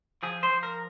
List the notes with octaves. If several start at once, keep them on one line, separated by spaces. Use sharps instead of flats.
F3 G#4
C5
F3
A#4